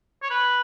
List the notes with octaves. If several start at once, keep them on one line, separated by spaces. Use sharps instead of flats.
C#5
B4